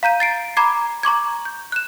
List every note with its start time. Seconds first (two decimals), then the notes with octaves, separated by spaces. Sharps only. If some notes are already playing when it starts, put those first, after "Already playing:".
0.03 F5 A#5 G6 D#7
0.20 A6 C7 D7
0.57 A#5 B5 D6 G#6 C7
1.03 A#5 C#6 D6 G#6
1.45 G6
1.72 F#6 E7